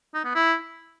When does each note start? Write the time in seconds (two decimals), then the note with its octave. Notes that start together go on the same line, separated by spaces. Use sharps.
0.14 D#4
0.25 B3
0.35 E4